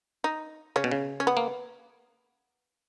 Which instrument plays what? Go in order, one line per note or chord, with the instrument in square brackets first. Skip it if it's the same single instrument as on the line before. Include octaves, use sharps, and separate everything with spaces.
[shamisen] D#4
[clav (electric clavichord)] C#3 [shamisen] C#4
[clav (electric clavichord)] B2
C#3
[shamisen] C#4
B3
[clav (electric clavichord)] A#3